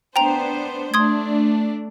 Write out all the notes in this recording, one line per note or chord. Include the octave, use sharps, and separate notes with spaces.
B3 D4 C5 G5 A#5 F7
A3 D4 C6 D#6 G#6